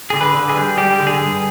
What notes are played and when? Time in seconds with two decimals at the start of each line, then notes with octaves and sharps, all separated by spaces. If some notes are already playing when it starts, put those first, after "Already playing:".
0.10 D3 G#4
0.21 B4
0.35 D3
0.49 G#4
0.57 G3
0.77 G3 G4
1.00 D3
1.07 G#4
1.21 G2